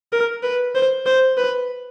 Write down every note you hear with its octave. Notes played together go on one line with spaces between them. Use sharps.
A#4
B4
C5
C5
B4